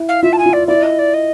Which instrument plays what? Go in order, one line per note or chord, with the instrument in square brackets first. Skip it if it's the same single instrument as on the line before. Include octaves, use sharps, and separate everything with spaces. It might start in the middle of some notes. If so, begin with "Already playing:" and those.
Already playing: [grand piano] E4
[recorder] F5
[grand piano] F4 [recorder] E5
[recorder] A5
G#5
[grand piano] F4
[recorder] D5
[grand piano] E4 [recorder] D5
[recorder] D#5
D5
D#5